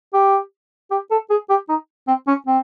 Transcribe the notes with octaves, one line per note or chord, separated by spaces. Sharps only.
G4
G4
A4
G#4
G4
D#4
C4
C#4
C4